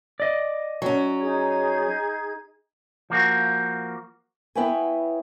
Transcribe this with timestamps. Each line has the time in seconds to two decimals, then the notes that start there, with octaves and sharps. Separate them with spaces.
0.20 D5 D#5
0.82 F#3 C#4
1.21 D#4 G#4 G#6
3.10 F3 A#3 F#4
4.55 B3 E4 B4 C#5 G5 G#5